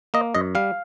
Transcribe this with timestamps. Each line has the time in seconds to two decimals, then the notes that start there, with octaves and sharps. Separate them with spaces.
0.14 A#3 D#5
0.35 F#2 D#5
0.55 G3 F5